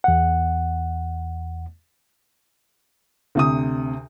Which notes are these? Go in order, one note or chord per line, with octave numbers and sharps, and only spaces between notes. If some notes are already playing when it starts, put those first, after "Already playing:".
E2 F#5
D2 C3 D#6